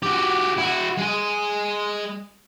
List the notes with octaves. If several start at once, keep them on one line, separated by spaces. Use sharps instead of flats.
F#4 G4
E4 F#4
G#3 G#5